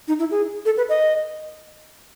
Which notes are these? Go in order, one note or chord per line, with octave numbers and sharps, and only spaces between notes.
D#4
E4
G#4
A4
B4
D#5